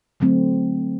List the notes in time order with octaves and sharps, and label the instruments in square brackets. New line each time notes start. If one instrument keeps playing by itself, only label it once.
[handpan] D3 F#3 A3 C4